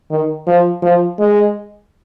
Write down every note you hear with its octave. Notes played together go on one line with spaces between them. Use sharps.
D#3
F3
F3
G#3